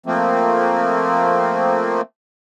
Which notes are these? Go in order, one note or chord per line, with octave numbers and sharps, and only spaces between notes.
F3 A3 A#3 C4